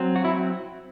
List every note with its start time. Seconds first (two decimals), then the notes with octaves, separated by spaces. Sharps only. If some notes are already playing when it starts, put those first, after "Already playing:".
Already playing: F#3 C4
0.16 F#4
0.25 E4